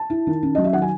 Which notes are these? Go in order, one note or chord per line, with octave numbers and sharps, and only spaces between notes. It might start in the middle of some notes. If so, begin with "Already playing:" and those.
Already playing: A5
E4
D#3
C#4
F#3 D#5
E5
D#3 F#5
G#5